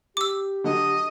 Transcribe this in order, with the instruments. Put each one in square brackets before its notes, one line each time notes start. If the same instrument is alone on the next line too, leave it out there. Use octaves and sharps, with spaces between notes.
[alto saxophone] G4 [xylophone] D6 E6
[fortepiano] D3 F#3 [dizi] D#5